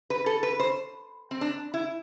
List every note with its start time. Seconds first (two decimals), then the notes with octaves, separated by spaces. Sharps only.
0.10 B4
0.26 A4
0.43 B4
0.60 C5
1.31 C4
1.41 D4
1.74 E4